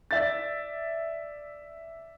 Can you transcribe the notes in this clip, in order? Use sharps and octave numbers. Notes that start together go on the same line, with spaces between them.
D5 E5 A6